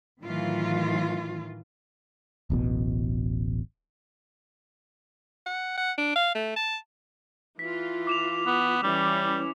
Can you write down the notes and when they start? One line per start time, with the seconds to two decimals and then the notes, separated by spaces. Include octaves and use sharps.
0.22 A2 D#3 E3 F#3 F4
2.50 D1 A1 B2
5.46 F#5
5.77 F#5
5.98 D4
6.16 F5
6.35 A3
6.56 A5
7.59 E3 F4 B6
8.07 D6 E7 F7
8.46 B3
8.83 E3 G3 C#4